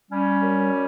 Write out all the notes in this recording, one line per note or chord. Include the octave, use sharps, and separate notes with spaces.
G3 C#4
F#2
G3